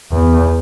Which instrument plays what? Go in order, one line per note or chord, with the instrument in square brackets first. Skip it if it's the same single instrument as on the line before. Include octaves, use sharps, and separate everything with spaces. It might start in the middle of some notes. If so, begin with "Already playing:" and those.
[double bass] E2